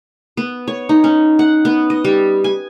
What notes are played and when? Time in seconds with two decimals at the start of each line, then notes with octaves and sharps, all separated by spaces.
0.37 B3
0.68 C#5
0.89 D#4
1.04 C#4
1.39 F#5
1.65 B3
1.90 D#5
2.04 G3
2.44 G#5